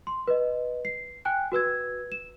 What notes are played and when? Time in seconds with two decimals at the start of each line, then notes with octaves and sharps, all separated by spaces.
0.07 C6
0.27 B4 D#5
0.85 C7
1.25 G5 G#5 F#6
1.52 F#4 B4 E6 G#6
2.12 E7